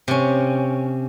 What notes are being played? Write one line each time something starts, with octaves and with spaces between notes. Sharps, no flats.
C3 C#4